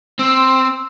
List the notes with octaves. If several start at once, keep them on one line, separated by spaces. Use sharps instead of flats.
C4 E6